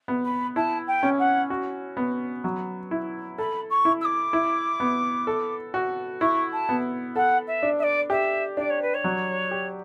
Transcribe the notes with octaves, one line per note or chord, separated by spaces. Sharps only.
B3
B5
E4 A5
G5
C#4
F#5
F#4
B3
F#3
E4
A4 B5
C#6
E4
E6
D6
E4
B3
A4
F#4
E4 C#6
A5
B3
A4 F#5
E5
D4
E5
D5
G4 E5
D4 D5
C#5
B4
C#5
F#3
G4